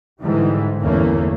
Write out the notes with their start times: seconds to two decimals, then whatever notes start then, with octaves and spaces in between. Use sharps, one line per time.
0.21 G#2 D3 E3 G3
0.80 G1 E2 E3 A3 A#3 C#4